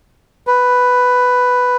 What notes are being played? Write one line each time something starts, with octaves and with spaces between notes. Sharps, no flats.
B4